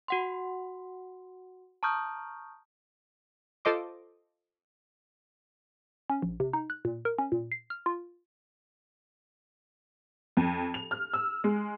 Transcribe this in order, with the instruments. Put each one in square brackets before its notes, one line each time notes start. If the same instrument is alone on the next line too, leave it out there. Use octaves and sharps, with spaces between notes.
[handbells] F#4 F#5 C6
A5 A#5 C#6 D#6 F6 G6
[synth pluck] F4 A4 C5 D#5 C6 D6
[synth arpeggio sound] C#4
A#1
C3
D#4
F#6
A#2
A#4
C#4
A#2
C7
F6
F4
[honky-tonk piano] F2
F7
F6
E6
G#3